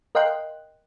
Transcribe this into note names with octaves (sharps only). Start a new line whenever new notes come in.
A#4 D#5 F5 G5 C6 F#6